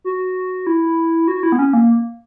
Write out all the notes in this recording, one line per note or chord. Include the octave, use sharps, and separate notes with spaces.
F#4
E4
F#4
E4
B3
C#4
A#3